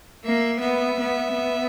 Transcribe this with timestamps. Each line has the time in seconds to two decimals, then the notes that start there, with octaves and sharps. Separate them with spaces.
0.23 A#3 E5
0.60 B3 E5
0.98 B3
1.34 B3